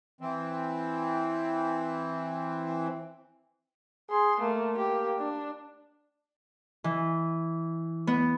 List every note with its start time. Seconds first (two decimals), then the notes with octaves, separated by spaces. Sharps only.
0.21 E3 C4
4.10 G#4 C6
4.40 A3 A#3
4.77 G4
5.18 D4
6.84 E3
8.07 B3